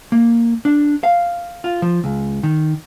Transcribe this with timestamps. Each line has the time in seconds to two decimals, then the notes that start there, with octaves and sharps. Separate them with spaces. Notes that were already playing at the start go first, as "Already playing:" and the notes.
0.12 A#3
0.65 D4
1.03 F5
1.64 F4
1.82 F3
2.04 C#2
2.43 D#3